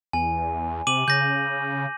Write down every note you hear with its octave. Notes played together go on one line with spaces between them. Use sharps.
E2 G#5
C3 D6 D#7 F#7
C#3 G6 A#6